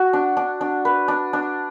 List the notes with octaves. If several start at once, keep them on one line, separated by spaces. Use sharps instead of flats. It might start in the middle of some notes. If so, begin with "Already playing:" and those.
Already playing: F#4
D4
D4
D4
B4
D4
D4